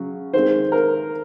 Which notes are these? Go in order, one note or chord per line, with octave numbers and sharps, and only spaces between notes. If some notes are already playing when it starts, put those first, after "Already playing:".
Already playing: C#3 F#3
D#3 G#3 C4 C5
A#4